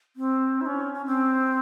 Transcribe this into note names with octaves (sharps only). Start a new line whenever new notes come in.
C4
E4
C#4
C#4
C4